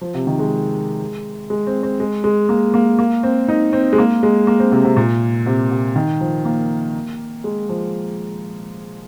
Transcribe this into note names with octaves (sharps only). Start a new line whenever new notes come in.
F3
C3
D#3
G#3
G#3
C4
C4
G#3
G#3
A#3
A#3
A#3
C4
D#4
C4
G#3
A#3
G#3
A#3
C4
C3
C3
A#2
C3
C3
D#3
F3
A#3
G#3
F3